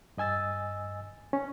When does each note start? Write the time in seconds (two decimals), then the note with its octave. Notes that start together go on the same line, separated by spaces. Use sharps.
0.17 G2 D#5 G#5 E6 A6
1.33 C#4